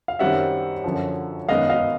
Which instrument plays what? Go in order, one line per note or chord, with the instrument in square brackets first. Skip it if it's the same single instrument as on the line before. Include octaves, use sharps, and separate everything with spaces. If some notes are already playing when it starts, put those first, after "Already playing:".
[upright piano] F5
F#2 D#3 G3 C4 E5 F#5
F#2 D3 F3
F#2 D#3 G#3 B3 D#5 F5
D#5 F5